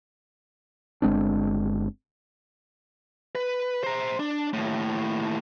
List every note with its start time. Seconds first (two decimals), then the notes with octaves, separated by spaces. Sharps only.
1.02 G1 G#3 C4 D4
3.35 B4
3.84 C5 A#5
4.19 D4
4.53 D#2 A2